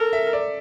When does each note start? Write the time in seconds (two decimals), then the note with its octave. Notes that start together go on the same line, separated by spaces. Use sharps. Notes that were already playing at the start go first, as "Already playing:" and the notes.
Already playing: A4 A#4
0.13 E5
0.33 D5